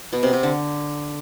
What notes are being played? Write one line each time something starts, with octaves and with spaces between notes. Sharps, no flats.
B2
C3
C3
D3